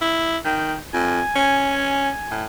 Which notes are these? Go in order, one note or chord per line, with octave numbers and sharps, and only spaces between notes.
E4
D#3 G5
F2 G#5
C#4
A2